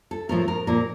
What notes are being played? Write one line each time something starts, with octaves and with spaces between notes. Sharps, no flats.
A4
A2 F3 A3 C4 A#4
A#4
A#2 F3 A#3 A#4